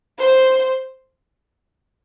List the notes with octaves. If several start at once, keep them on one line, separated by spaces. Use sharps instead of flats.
C5